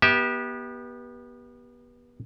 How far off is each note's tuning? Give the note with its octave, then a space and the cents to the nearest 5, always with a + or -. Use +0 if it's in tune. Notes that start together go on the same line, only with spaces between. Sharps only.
B3 -30 G4 +0 E5 -25